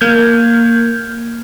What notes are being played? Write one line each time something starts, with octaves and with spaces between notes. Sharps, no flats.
A#3 F6 G6 G#6